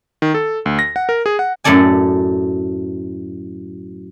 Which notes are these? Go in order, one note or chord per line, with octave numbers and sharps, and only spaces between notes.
D#3
A4
D2
A#6
F#5
A#4
G#4
F#5
F#2 A2 A4 D5 G#5